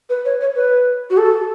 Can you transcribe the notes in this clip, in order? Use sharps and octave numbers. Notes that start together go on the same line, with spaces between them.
B4
C#5
C#5
B4
F#4
A4